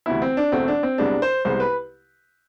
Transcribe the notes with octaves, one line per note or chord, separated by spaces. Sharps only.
D2 C3 E3 B3 E4
C4
D4
E2 B2 A3 C4
D4
C4
C2 C3 G#3 B3 D4
C5
C2 C3 G#3 B3 C5
B4